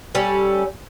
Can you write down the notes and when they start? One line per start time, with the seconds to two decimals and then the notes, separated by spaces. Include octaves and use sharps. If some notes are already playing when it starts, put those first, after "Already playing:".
0.15 G3 C#4 A4